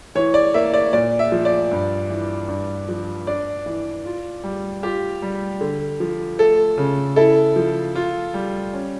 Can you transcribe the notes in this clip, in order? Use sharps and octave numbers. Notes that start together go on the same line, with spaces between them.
E3 C#5
D5
A#3 E5
D5
A#2 D5
E5
F3
D5
G2
E3
G2
F3
D4 D5
E3
F4
G3
F4 G4
G3
D3
F3
A3 A4
C#3
E4 A4
F3
F4
G3
C#4